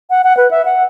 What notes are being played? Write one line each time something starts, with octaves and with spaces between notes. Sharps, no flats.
F#5
F#5
B4
E5
F#5